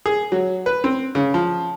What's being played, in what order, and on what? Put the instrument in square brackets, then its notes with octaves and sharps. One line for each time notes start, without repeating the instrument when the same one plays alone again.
[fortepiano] G#4
F#3
B4
C4
C#3
F3